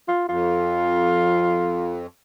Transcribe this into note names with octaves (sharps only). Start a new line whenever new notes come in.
F4
F2 F4